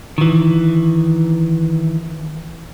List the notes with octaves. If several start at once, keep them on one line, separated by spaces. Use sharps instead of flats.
D#3 E3